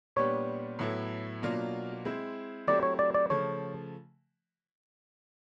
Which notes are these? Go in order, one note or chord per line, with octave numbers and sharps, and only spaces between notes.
A#2 G3 B3 D4 G4 C#5
A2 F#3 B3 E4 A4
B2 F#3 A#3 D4 F4
G#3 C4 E4
F#3 A3 C4 E4 G4 D5
C#5
D5
D5
C#3 F3 A3 C#5